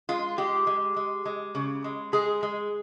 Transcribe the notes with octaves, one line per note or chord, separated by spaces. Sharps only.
G#3 F4
G#3 G4
G#3
G#3
G#3
C#3
G#3
G#3 G#4
G#3